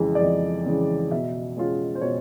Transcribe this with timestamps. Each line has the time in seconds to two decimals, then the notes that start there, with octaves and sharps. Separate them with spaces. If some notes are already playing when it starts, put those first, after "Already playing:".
Already playing: F2 C#3 E3 G#3
0.15 D5
0.21 F2 D#5
0.66 C#3 E3 G#3
1.11 B2 E5
1.57 G#3 C#4 F4
1.95 C5
2.01 B2 C#5